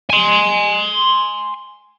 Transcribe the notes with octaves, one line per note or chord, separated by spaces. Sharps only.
G#5 C6